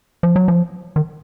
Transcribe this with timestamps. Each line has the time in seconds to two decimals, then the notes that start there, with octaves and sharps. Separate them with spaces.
0.23 F3
0.36 F#3
0.48 F3
0.96 D#3